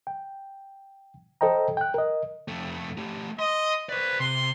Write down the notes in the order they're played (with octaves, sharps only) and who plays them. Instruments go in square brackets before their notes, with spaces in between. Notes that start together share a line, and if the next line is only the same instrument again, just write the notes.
[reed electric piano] G5
A4 C5 D#5 G5 A#5
G5 F#6
A#4 D#5
[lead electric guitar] F2 A3
A3 G4
[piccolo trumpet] D#5 [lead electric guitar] C6
[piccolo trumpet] B4 [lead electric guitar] C5 D5
[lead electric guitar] C3 [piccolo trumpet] C6